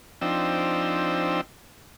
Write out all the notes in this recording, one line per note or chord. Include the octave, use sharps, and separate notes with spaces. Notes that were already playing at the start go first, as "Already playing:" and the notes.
F3 C4 D4 D#4 G5 E6